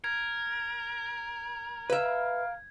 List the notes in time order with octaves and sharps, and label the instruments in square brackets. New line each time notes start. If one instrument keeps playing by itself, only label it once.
[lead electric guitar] A#4 [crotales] G#6
[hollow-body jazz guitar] B4 E5 [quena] F5